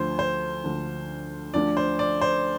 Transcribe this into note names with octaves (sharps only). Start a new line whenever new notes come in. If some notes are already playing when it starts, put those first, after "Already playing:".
Already playing: D2 D3 F3 D4 C5
C5
D2 D3 F3 D4
D2 D3 F3 D4 D5
C5
D5
C5